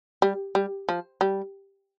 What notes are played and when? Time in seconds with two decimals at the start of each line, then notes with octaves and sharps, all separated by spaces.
0.22 G3
0.55 G3
0.89 F3
1.21 G3